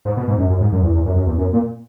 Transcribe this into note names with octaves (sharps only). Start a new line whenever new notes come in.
G#2
B2
G#2
F#2
F#2
G#2
F#2
E2
E2
F#2
F#2
E2
F#2
A#2